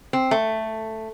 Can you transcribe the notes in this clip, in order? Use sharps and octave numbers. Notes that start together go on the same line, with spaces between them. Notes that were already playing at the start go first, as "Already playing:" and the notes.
C4
A3